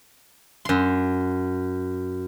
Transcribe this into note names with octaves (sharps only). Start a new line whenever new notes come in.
F#2 C6